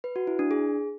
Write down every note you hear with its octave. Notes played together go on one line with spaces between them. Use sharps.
B4
F#4
E4
D4
G#4